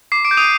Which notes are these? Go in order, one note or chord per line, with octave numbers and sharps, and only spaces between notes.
D6 C7
D6 D7
G6
D#6 D#7